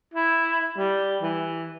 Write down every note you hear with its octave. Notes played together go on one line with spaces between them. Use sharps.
E4
G3
E3